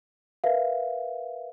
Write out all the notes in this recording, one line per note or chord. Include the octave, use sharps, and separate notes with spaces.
A#4 B4 E5 F5